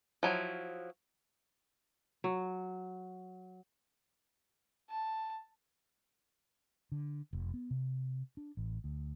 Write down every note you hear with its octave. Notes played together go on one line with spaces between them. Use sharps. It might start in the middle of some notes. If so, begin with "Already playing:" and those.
F3 F#3 E4
F#3
A5
D3
F1
B3
C3
D4
A1
D2